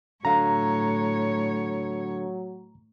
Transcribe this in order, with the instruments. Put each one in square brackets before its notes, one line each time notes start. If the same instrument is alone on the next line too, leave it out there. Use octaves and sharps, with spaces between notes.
[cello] A2 C#5 [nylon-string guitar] D3 F5 [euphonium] F#3 [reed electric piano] A#5